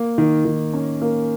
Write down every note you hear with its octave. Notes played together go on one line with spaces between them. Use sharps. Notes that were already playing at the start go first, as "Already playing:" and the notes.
Already playing: A#3
D#3
D#3
C#4
A#3